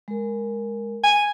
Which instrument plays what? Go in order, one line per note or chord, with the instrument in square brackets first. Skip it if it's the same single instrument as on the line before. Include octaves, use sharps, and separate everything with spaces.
[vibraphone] G#3 A#4
[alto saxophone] G#5